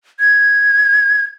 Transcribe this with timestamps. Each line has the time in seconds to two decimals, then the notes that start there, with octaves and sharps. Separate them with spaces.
0.20 G#6